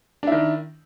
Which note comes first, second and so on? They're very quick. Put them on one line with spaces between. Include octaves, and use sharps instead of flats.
D4 E4 D#3